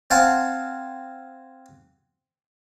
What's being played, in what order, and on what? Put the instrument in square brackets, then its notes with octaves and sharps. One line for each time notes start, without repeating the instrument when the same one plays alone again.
[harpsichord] C4 F5 F#5 G#5 A5